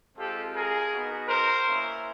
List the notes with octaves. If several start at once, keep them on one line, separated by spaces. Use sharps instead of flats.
G#3 C4 F4 G4 A4
G#4 A#4
B3 D#4 F#4
A#4 C5
A#3 C#4 E4